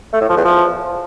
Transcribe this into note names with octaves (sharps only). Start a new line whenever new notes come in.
A3
A2
F3
E2
F3